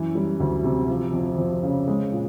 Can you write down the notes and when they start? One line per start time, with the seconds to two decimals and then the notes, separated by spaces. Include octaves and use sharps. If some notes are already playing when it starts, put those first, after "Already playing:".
Already playing: F#2 E3
0.15 G3
0.40 D2
0.64 C3
0.89 F3
1.13 F2
1.38 F2
1.63 C#3
1.87 G#3
2.13 A#2